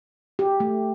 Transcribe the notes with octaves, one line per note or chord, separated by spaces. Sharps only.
G4
A3